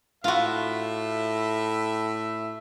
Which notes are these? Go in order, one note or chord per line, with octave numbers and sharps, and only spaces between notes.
A2 F4 F#4 E5